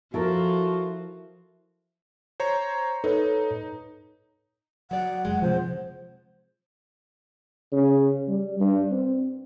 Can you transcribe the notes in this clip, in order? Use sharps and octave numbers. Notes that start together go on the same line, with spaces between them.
F3 E4 F#4 A4 A#4
C5 C#5 A#5
D#4 A4 B4 C#5
F#3 D5 F#5
F1 G#3
C3 F3 C5
C#3
G3
G2
C4